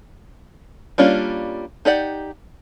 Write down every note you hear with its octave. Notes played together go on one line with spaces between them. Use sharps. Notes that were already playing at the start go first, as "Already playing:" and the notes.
G3 A#3 C#4 D4 F4
D#4 G4 D5 F#5